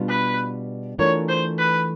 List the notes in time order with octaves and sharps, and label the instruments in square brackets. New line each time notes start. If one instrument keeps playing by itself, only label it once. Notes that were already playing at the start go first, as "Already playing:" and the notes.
Already playing: [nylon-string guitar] B2 G3 B3 D4 F4
[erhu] B4
[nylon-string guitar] E3 A3 D4 F4 A#4 [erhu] C#5
[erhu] C5
B4